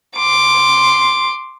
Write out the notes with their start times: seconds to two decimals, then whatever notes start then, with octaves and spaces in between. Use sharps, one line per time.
0.17 C6 D6